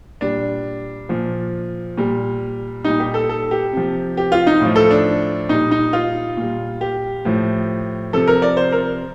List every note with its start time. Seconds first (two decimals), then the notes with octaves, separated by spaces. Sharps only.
0.21 A#2 G3 D4
1.09 A#2 F3
1.97 A#2 G3
2.84 A#2 G3 D#4
3.00 G4
3.14 A4
3.29 A4
3.51 G4
3.73 C3 F3
4.17 G4
4.32 F4
4.47 D#4
4.61 A2 F3
4.76 A4
4.91 D4
5.49 A#2 G3 D#4
5.71 D#4
5.93 F4
6.37 A#2 G3
6.81 G4
7.25 A2 F3
8.13 C3 F3 A4
8.28 A#4
8.42 D5
8.57 C5
8.72 A#4